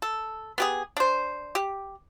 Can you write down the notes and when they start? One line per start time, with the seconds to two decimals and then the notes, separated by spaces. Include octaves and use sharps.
0.02 A4
0.58 B3 G4 G#4
0.97 D4 C5
1.55 G4